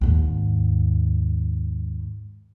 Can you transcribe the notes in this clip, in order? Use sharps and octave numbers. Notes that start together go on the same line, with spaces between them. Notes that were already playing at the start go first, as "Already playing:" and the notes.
D#2 G#2